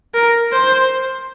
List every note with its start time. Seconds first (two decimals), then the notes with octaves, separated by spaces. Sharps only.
0.14 A#4
0.53 C5